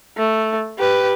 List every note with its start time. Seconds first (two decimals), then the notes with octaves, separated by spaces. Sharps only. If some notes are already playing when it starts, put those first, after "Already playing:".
0.17 A3
0.78 G4 B4